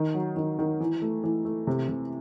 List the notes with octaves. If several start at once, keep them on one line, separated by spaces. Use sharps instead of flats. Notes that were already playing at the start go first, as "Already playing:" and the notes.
Already playing: D#3
F#3
D#3
D#3
E3
A3
E3
A3
C3
C3